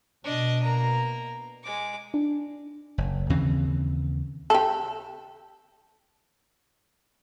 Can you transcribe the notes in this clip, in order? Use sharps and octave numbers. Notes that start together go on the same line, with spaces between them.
B2 D4 D#5
A#3 A#5
G#3 D6
D4
F#1
D#2 C#3 E3 C4
G4 A4